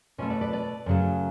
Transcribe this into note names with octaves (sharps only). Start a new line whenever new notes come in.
B2 A3 C#4 F4
B4 D5
B4 D5
B4 D5
F#2 C#3 F#3 A3